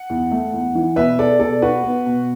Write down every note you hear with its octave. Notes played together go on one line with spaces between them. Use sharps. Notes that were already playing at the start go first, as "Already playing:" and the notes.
Already playing: F#5
E2
A3
E2
E3
B2 B4 E5
B3 A4 D5
B2 A4 D5
B3 F#4 B4
B3
B2